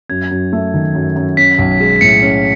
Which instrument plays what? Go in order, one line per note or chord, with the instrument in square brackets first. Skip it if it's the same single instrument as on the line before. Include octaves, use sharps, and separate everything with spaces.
[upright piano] F#2 [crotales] G#6
[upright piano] F#2
A3
D#3
F#2
F#2
[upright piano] C#4 [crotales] B6
[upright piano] B1
G#3
[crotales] B6
[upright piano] A2 [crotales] C#7
[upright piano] C#4